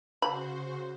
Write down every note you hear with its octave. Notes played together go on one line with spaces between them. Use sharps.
C#3 F#4 C5 B5